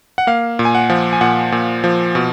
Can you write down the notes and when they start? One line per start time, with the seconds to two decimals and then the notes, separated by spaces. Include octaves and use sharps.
0.18 F#5
0.27 A#3 F5
0.59 A#2
0.65 G#5
0.75 F#5
0.90 F3
1.13 G#5
1.21 A#2 F#5
1.52 A#2
1.84 F3
2.15 B2